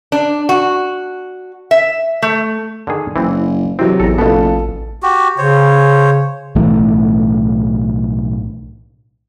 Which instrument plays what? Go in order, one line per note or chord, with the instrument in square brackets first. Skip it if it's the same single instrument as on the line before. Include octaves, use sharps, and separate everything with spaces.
[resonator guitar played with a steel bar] D4
F#4
E5
A3
[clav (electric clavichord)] D3 D#3 G#4
[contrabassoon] F#1 [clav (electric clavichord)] E3 C4
[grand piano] C3 F#3 [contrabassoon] E3 [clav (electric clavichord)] C4
[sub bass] A1 [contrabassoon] E2 [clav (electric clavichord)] A4 A#5
[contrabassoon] F#1 [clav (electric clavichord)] B2 B3 [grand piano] F4 A4
[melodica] F#4 G4
[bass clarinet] C#3 [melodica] C5 C#5
[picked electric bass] B1 A2 E3 A3